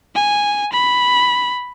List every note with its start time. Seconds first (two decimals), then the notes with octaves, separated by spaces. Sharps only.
0.15 G#5
0.72 B5